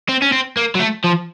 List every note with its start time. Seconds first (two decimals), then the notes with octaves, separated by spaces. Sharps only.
0.09 C4
0.22 C#4
0.32 C4
0.57 A#3
0.75 F#3
0.79 A3
1.04 F3